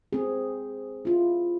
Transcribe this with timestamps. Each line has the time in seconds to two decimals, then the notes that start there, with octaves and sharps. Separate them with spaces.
0.13 C4 G#4
1.05 E4 F4